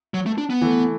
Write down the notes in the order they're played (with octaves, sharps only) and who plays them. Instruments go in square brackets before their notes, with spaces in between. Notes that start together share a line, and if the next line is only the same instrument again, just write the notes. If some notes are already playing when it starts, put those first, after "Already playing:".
[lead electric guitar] F#3
A3
D4
B3
[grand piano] E3 A3